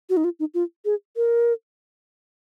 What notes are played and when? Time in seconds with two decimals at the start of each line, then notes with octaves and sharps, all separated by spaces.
0.10 F#4
0.17 D#4
0.24 F4
0.40 D#4
0.54 F4
0.85 G#4
1.16 A#4